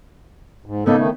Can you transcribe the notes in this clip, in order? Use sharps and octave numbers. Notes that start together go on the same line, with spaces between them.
G#2
C#3 A#3 B3 D#4 A4
D#3 A3